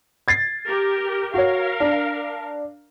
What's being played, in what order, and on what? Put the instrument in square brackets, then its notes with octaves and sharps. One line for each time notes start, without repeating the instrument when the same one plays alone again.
[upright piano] G#6 A6 C7
[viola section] G4 A#4
[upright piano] F#4 C#5 [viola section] A#4 F5
[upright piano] D4